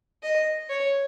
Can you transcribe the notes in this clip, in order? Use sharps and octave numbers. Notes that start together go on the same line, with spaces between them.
D#5
C#5